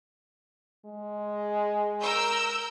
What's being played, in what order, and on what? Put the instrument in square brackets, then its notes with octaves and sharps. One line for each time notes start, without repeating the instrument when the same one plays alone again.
[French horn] G#3
[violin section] A#4 E6 G6